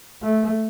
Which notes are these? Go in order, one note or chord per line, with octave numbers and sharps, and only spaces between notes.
A3